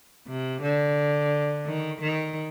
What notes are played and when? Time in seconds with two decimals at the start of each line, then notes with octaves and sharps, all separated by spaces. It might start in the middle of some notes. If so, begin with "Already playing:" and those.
0.27 C3
0.62 D3
1.66 D#3
2.01 D#3